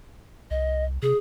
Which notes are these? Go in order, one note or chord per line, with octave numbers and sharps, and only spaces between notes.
C2 D#5
C3 G#4